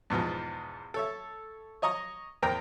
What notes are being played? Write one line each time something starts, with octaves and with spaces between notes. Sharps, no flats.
E2 G#2 B2 F3
A4 C#5 E5
C#5 D#5 A#5 C#6 D#6
E2 A#4 C5 G5 A#5